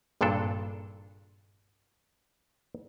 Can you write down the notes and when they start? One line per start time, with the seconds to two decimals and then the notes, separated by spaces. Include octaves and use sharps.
0.21 G#1 G2 A#2 D4 A4